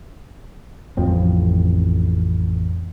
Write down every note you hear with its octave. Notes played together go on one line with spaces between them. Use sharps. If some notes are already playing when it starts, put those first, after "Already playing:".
A1 F2 F3 C4